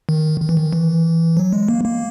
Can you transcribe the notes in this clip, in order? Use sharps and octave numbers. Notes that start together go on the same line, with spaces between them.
D#3
D#3
E3
D#3
E3
F#3
G#3
A#3
A#3